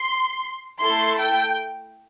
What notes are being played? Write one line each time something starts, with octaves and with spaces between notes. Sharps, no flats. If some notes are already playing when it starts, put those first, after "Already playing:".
Already playing: C6
A3 E4 A4 C6
G5